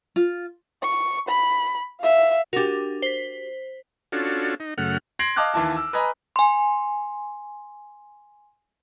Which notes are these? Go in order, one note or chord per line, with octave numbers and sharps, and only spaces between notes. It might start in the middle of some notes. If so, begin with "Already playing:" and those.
F4
C#6
B5
E5 F5
D4 F#4 G4 A#4
C5 B6
C#4 D4 F4 F#4 A4
D#4
F#2 C#3 A3 F#5 F6
C6 G#6 A#6 C7 D7 F#7
D#5 F5 A5 D6 F6 F#6
D#2 E3 E4 A5
E6
B4 D#5 G#5 A#5 B5
G#5 C6